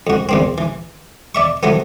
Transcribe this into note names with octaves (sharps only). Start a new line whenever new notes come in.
F2 F#4
E2 A#3 C4
E3
D5 E5 C#6
F3 F#3 A3 B3